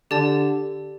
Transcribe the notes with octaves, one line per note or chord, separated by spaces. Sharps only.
D3 G4 D5 A5